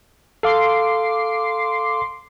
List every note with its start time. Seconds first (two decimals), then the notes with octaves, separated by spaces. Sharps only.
0.43 A4 F5 C6 D6 C7